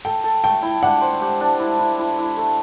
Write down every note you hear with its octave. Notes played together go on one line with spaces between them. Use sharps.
A4 G5
A4
A3 G5
E4
D4 F#5
C5
G4
D4
E4
E4
E4
E4
A3